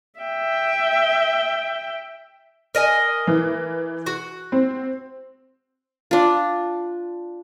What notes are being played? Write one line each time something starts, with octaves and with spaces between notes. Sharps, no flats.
E5 G5
A#4 D#5 G#5
E3
F#4
C4
D4 F4